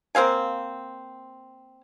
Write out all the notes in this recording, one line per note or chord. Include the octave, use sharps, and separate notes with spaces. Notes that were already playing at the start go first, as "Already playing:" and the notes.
A#3 C4 F5 G#5